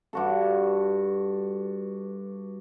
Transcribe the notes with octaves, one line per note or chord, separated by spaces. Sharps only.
G2 F#4 A4